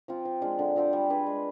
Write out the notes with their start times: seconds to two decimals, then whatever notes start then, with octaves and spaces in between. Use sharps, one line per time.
0.08 F3 C4 F4
0.25 F3
0.42 G#3 D4 F4
0.59 D3
0.76 F3 C4 G4
0.93 G3
1.10 D4 G#4 B4
1.26 G#3